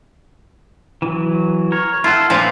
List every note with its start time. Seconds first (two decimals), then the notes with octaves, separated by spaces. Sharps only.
1.02 E3 F#3
1.72 A#4 C#5
2.04 E4 F4 A4 F#5
2.30 A#2 F3 E4 B4 D6